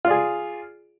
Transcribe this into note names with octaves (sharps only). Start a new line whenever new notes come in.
F4 G#4 D5